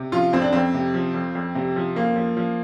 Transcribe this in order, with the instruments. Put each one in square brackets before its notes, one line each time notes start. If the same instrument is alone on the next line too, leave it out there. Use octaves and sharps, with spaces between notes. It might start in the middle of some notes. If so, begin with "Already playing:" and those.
Already playing: [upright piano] C3
F3 F4
F2 C4
D4
F2 C4
C3
F3
F2
F2
C3
F3
F2 A#3
F3
F3